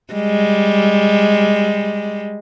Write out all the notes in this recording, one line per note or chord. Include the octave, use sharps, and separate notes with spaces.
G3 G#3